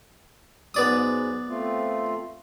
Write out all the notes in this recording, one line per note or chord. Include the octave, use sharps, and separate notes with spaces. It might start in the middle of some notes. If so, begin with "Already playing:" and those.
G#2 F#3 G#3 B3 D5 D#6
A3 C4 F4